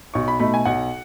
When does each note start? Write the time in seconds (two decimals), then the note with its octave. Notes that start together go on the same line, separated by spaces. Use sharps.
0.14 B1 C#6
0.28 B5
0.40 B2 A3 D#4 B5
0.54 G#5
0.65 B1 F#5